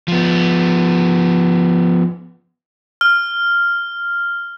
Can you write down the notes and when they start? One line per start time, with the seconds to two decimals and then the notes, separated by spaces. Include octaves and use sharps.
0.08 F3 B3
3.01 F6